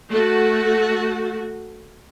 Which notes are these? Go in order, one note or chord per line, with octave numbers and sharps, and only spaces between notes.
A3 F#4